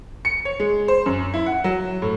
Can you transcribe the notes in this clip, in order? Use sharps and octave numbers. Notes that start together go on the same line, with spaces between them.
C#7
C#5
G#3
C5
F#2
E4
F#5
F#3
A2